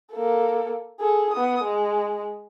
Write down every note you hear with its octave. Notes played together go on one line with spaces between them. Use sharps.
A#3 A4
G#4 A4
B3 D#6
G#3